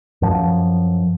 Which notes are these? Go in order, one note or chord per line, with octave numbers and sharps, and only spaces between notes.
F#2 F3